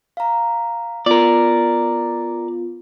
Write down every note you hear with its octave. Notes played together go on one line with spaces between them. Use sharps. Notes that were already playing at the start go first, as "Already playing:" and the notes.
F5 A#5
B3 F4 A#4 D5